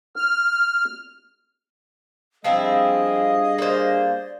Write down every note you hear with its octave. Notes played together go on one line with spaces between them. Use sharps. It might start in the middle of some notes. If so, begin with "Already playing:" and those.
F6
F3 G3 C4 D4 E4 G#4 D#5 F5
A#3 C5 D5